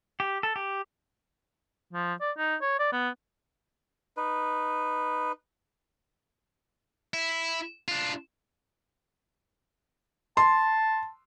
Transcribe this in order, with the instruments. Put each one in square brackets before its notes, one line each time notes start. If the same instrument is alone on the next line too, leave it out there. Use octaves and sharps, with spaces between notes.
[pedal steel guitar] G4
A4
G4
[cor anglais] F3
D5
D#4
C#5
D5
B3
[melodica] D#4 B4
[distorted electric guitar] E4
D4 F4
[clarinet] A5 [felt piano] C6